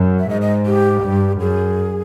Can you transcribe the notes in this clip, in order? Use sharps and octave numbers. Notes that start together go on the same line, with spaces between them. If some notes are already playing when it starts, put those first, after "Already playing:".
Already playing: F#2
E5
G#2 D#5
D#5
G4
G2
F#2 G#4